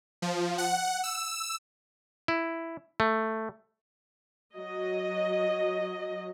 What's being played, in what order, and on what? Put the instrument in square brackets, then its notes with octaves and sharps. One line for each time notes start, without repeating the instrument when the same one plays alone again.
[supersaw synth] F3
F#5
E6
[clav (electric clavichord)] E4
A3
[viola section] F#3 D#5